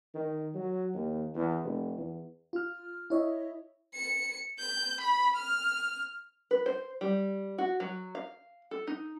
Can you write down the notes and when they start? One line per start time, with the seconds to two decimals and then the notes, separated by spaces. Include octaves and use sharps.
0.14 D#3
0.54 F#3
0.94 D#2
1.35 E2
1.63 F1
1.97 E2
2.53 F4 F6
3.10 E4 C#5 D#5 E5
3.94 C#7
4.59 G6
5.01 B5
5.37 F6
6.51 B4
6.66 C5
7.01 G3
7.58 F#4
7.80 F#3
8.15 F5
8.71 A4
8.87 D#4